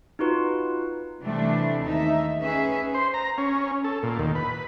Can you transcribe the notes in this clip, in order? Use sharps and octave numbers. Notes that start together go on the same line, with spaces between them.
D#4 F4 F#4 B4
C3 E3 G3 A3 D4 E4
D#2 D#4 E5
C#4 G#4 B4 E5
C5
A#5
C#4
A4
A#2
D#2
B4